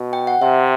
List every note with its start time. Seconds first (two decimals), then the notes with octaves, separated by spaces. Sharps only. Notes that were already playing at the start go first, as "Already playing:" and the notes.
Already playing: B2
0.13 G5
0.27 F#5
0.41 C3 E5